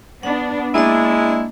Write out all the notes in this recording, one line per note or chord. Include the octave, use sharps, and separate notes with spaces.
B3 D4 F#5
G#3 A#3 D4 E4 D#5